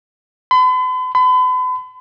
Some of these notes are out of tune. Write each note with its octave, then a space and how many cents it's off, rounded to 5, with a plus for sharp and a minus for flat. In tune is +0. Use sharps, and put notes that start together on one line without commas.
B5 +45
B5 +40